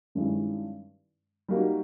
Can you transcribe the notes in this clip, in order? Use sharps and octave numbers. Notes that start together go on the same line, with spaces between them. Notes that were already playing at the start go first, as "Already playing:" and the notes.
G2 D#3 G#3 C#4 E4
G3 A#3 D#4 F#4